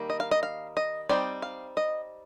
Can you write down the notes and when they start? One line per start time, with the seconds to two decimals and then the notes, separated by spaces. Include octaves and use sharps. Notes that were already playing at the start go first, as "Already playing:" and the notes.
Already playing: D#3 G3 A#3
0.10 D#5
0.20 F5
0.31 D#5
0.43 F5
0.77 D#5
1.09 G3 C4 D#4 D5
1.42 F5
1.77 D#5